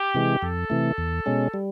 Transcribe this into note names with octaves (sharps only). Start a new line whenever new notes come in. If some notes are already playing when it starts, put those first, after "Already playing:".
Already playing: G4
C3 E3 G#3
F2 A4
C3 E3 A3
E2
B2 G#3 C#4
G3